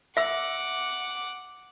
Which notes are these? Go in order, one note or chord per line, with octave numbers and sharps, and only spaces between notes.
E5 F#5 D6 E6